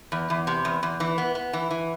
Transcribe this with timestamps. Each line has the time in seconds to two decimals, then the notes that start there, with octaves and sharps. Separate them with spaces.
0.12 E2
0.30 E2
0.47 C3
0.65 E2
0.83 E2
1.00 E3
1.18 B3
1.35 B3
1.53 E3
1.71 E3